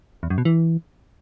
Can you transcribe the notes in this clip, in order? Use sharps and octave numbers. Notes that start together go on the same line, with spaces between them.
E2
F#2
B2
E3